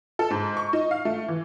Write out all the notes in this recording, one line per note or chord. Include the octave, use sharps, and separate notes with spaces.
A4
G#2
C#6
D#4
F5
A3
E3